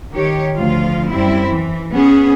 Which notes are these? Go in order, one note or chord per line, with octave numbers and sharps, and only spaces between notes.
D#3 G4 C#5
D2 F3 F4 F5
F#2 G3 C4 E4
E3
B3 C#4 G#4